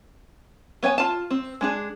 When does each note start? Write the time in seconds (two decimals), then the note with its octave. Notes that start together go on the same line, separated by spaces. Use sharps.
0.83 B3 C#5 G5 G#5
0.98 F4 A5
1.30 C4
1.61 G#3 D4 G#4